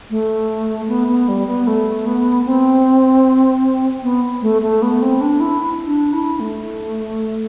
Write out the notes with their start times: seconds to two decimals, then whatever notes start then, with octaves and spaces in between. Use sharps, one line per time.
0.10 A3
0.88 B3
1.08 B3
1.28 G3
1.47 B3
1.67 A3
2.06 B3
2.46 C4
4.03 B3
4.42 A3
4.62 A3
4.82 B3
5.02 C4
5.21 D4
5.40 E4
5.86 D4
6.13 E4
6.40 A3